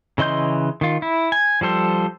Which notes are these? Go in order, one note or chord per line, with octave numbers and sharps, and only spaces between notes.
C#3 E3 D#5 C6 G6
D#3 F4
E4
G#5
F3 G3 A4 C5